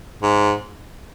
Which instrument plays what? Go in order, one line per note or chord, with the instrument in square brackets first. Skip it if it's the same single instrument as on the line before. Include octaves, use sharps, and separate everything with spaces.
[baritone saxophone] G#2